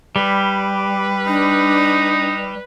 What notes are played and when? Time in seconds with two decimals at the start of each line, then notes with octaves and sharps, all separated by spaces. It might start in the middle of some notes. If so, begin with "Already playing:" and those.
0.16 G3 B4
1.27 D4 D#4